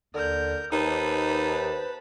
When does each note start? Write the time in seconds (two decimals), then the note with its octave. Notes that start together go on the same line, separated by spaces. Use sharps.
0.14 D#2 D3 A#4 G6
0.72 D#2 D#4 B4 C5 A5 B5